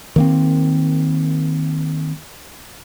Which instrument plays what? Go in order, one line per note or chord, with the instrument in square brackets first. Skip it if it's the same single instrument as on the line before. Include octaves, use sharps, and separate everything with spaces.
[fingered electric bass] D#3 A#3 C4